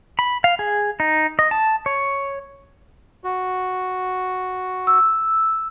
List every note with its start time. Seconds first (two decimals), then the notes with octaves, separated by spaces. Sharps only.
0.19 B5
0.44 F5
0.59 G#4
1.00 D#4
1.39 D#5
1.51 A5
1.86 C#5
3.24 F#4
4.87 E6